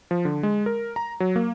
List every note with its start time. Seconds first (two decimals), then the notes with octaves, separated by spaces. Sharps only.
0.11 F3
0.25 D3
0.43 G#3
0.66 A#4
0.96 A#5
1.20 F#3
1.36 A#3